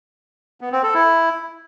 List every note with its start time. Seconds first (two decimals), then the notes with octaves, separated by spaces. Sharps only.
0.61 B3
0.72 C4
0.83 A4
0.94 E4